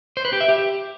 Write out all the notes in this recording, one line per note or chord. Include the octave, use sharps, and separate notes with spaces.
C5
B4
G4
E5
G4